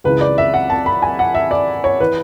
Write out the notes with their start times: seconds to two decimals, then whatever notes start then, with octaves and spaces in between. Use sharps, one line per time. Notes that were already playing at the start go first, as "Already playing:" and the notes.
0.04 C#2 C#3 E3 B4
0.21 D5
0.38 E5
0.54 F#5
0.70 A5
0.86 B5
1.02 G#5
1.19 F#5
1.35 E5
1.51 D5
1.84 C#5
2.01 E3 B4